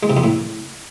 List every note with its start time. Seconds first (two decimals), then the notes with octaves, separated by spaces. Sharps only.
0.03 G#3
0.10 C3
0.17 F2
0.24 A2